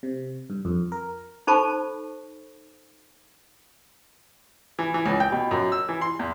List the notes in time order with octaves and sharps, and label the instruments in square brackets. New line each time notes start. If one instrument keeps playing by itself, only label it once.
[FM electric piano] C3
G2
F2
A#4
[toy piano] D#4 A4 C5 A5 B5 C#6
[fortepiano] E3
E3
C#2
G5
B2
F#2
E6
E3
C6
E2